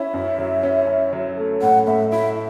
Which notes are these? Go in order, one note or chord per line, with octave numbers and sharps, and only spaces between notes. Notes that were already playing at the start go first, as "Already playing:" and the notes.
Already playing: C#4 E4 E5
F#2
F#3
C#4
C#4
F#3
A3
A2 F#5
A2 E5
E4 E5